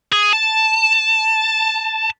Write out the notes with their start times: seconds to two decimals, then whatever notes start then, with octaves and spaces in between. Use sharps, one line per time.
0.12 G#4
0.33 A5